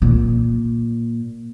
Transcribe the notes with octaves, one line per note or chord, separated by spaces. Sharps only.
A#2